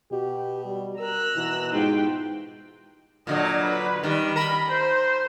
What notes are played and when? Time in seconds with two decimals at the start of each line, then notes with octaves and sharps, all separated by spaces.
0.11 B2 G4
0.65 G3
0.99 A#4 A#5 E6 F#6
1.36 B2 E3
1.73 G#2 F4 G4 G5
3.27 A#2 D3 F#3 D#5
3.62 B4
4.03 D#3 G3
4.36 A#4 B5
4.70 C5